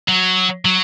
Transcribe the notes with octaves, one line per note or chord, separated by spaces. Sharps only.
F#3
F#3